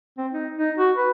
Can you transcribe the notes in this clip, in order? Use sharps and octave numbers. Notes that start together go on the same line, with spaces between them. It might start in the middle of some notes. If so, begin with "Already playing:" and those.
C4
D#4
D#4
F#4
B4